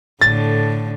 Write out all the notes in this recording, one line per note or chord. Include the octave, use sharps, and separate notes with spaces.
A2 D3 A6